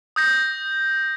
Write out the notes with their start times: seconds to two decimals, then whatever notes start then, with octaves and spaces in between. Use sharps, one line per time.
0.16 D#6 G6 A#6